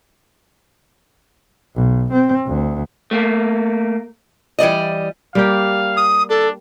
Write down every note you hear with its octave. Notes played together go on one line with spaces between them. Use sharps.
B1
C4
D2
A3 A#3
E3 G3 D5 D#5
G3 A#3 G4 F5
D#6
D4 A4